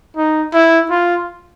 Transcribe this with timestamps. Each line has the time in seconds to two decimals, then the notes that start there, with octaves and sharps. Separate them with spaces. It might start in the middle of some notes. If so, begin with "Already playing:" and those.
0.17 D#4
0.54 E4
0.91 F4